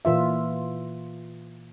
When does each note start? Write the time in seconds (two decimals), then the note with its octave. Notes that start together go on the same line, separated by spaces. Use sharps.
0.05 A#2 E3 F4 E5